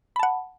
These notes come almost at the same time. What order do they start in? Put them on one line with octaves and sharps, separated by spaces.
B5 A5 F#5